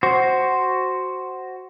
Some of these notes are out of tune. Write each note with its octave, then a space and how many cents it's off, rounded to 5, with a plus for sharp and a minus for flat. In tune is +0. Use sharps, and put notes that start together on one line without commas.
F#4 +10 C5 +0